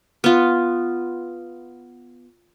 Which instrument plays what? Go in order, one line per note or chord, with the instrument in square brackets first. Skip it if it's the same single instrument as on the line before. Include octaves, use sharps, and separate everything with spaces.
[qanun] B3 F4